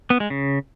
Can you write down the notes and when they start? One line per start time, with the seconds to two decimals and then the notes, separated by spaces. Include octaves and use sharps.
0.10 B3
0.20 G#3
0.30 C#3